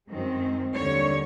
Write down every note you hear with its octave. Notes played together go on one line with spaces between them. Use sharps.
F#2 D#3 G#3 C4
D#2 D3 G3 C#5